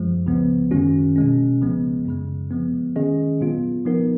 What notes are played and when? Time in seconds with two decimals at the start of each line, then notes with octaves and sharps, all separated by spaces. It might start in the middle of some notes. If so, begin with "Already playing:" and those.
Already playing: F#2 F3 G#3
0.27 C#2 C#3 F3 B3
0.71 F#2 D#3 G#3 C#4 F#4
1.16 B2 G#3 C#4
1.61 C#2 C#3 F3 G#3 B3
2.06 F#2 C#3 G#3
2.51 F3 G#3 B3
2.96 D#3 G#3 C#4 G#4 D#5
3.40 A#2 F#3 B3 F4
3.85 F3 B3 D#4 A#4